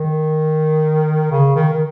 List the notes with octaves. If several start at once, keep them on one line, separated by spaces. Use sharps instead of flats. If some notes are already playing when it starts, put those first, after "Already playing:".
Already playing: D#3
C#3
D#3
D#3